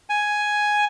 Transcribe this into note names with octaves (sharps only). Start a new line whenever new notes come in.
G#5